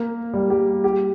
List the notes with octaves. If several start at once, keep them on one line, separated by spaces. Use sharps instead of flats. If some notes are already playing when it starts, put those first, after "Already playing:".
Already playing: A#3
G3
G4
G4